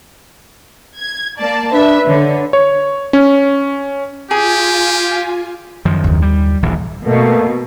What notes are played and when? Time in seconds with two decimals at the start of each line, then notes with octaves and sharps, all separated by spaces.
0.97 G#6
1.39 A#3 D5 A5
1.72 D4 B4 E5
2.08 D3 C#5
2.53 C#5
3.13 C#4
4.31 F4 G4 G#4 G#5
5.85 F#2 D#3 F3
6.04 D#2 D3
6.22 G3
6.62 D#1 A#1 E3
7.07 B2 A3 A#3